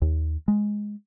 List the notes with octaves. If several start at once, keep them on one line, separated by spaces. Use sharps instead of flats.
D#2
G#3